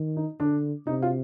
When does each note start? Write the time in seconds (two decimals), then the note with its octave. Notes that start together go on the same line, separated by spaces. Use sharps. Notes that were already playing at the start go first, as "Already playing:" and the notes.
Already playing: D#3
0.17 D#4
0.40 D3 D4
0.87 C3 D#4
1.02 F4